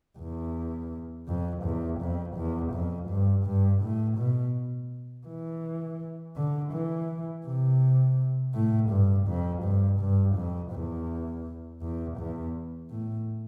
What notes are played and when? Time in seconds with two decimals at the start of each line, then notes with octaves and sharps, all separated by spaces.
0.18 E2
1.27 F2
1.64 E2
2.00 F2
2.36 E2
2.73 F2
3.09 G2
3.45 G2
3.82 A2
4.18 B2
5.27 E3
6.36 D3
6.72 E3
7.46 C3
8.54 A2
8.91 G2
9.27 F2
9.63 G2
10.00 G2
10.36 F2
10.72 E2
11.82 E2
12.18 E2
12.90 A2